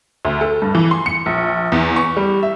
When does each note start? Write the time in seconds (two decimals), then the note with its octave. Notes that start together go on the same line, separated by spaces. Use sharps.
0.25 D2
0.41 A4
0.62 G2
0.75 E3
0.91 C6
1.06 C#7
1.26 A#1
1.72 E2
1.96 C#6
2.17 G3
2.43 E5